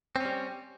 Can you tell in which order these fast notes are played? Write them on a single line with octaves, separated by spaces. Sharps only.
C4 C#4 G3